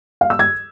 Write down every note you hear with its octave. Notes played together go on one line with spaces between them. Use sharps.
F5
E6
G#6